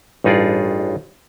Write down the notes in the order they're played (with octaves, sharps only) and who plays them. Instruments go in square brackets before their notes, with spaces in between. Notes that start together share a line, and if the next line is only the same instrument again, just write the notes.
[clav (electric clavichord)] A1 G2 D#4 F4 G#4 D5